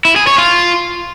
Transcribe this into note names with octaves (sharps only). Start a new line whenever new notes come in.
E4
G#4
C#5
F4